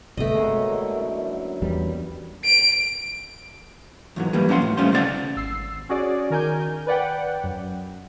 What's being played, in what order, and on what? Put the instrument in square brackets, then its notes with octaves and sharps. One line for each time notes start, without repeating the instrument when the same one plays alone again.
[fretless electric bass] G1 C3 B3 [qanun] A3 D#5
[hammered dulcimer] B2 A#3 C#5 [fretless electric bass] G#3
[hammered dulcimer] D3 E4 G5
F#2
[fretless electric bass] E2 G3 [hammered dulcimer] B4
[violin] D7
[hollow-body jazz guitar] E2 G#2 F#3
E3 G3 A#3
F2 C#4 D4 A#4 F#5 C6
A2
G3 A3 C#4 F4 C5
D2 C#3 C4 D#4 D5 F#5
[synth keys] G#1 E6 C7
C#4 F#4 G#4 D5
D#3 A#4 G#5 G6
B4 D5 F#5 G5
F#2